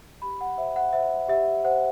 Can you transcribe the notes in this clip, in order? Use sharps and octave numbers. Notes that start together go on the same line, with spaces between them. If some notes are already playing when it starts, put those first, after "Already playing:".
G4 B5
F#5
C5 E5
F#5
C5 E5
G4 E5
C5 F#5